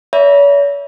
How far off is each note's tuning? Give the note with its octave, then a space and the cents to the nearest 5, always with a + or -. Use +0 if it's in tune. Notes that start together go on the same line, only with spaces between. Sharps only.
C#5 +45 E5 +0 B5 -40